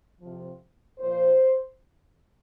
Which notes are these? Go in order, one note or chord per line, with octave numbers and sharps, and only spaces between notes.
F2 C3 F3
A#2 F3 C5